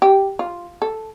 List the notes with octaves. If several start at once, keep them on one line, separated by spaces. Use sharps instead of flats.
G4
F4
A4